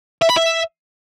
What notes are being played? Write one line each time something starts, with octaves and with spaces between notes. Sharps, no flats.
E5
B5
E5